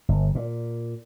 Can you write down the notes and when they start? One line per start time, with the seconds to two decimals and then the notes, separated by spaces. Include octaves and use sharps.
0.09 G1
0.35 A#2